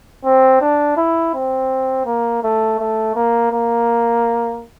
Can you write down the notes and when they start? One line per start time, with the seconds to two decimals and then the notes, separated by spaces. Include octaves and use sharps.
0.25 C4
0.61 D4
0.97 E4
1.34 C4
2.06 A#3
2.43 A3
2.80 A3
3.15 A#3
3.52 A#3